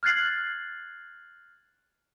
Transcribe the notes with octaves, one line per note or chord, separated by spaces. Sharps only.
F6 F#6 G#6 A6 C7 F#7